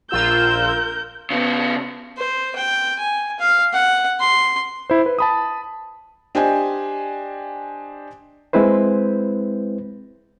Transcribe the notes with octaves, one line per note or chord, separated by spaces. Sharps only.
A#1 F4 A#4 E6 G6
C#3 B3
C5
G5
G#5
F5
F#5
C6
E4 C5
B4
A5 B5 D#6
D4 G4 C5 D#5 G5 G#5
G#3 C4 E4 B4 C5